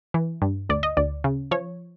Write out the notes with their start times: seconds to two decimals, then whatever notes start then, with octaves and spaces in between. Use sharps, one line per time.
0.14 E3
0.42 G2
0.69 D2 D5
0.83 D#5
0.97 D2 D5
1.24 C#3
1.51 F3 C#5